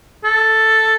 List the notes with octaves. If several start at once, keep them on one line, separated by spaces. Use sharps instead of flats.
A4